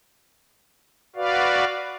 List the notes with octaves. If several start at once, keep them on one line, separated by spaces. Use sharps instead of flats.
F#4 B4 D5 F5